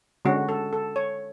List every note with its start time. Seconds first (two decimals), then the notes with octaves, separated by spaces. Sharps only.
0.25 D3 G#3 C#4 F#4
0.49 A4
0.73 A4
0.96 C#5